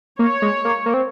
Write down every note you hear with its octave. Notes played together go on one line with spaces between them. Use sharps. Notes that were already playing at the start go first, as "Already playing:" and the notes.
A#3 C#5
G#3
A#3
A#3
C4